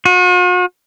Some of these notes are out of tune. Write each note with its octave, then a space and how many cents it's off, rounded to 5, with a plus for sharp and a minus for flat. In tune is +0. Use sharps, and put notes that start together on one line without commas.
F#4 -45